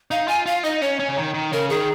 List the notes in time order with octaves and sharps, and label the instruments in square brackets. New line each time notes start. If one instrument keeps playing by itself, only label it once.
[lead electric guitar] D#4 [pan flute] F5
[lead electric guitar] F4 [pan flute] G#5
[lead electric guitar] F4 [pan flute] F5
[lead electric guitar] D#4 [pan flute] D#5
[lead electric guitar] C#4 [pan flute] C#5
[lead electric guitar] C#4
C#3
D#3
D#3
[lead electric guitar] C#3 [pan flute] A#4
[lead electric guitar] D#3 [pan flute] G#4